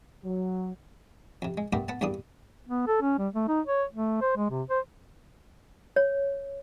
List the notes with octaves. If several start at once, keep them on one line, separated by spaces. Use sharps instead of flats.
F#3
F2 C3
G#3
G2 A3 B3 G4 A#4 G5
B3 F#5 A5
E2 G2 G3 A#3 D4 D#6
B3
A4
C#4
G3
A3
D#4
C#5
A3
C5
G#3
C3
C5
C#5